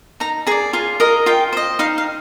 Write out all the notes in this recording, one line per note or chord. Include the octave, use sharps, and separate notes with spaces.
D#4 A#5
G#4 D5 A#5
F4 G#5
A#4 D#5
F4 G5
C5 D#5
D#4 F5
F5